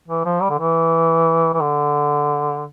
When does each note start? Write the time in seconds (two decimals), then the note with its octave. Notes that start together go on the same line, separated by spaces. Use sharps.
0.08 E3
0.25 F3
0.42 G3
0.50 D3
0.59 E3
1.54 E3
1.61 D3